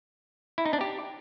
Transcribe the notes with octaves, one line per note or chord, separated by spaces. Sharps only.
E4
D#4
D4
G4